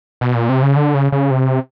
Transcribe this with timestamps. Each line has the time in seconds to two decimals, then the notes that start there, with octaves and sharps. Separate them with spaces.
0.21 B2
0.35 A#2
0.49 C3
0.63 C#3
0.76 D3
0.94 C#3
1.12 C#3
1.31 C3